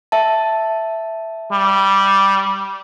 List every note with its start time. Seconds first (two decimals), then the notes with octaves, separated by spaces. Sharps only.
0.12 E5 A5
1.52 G3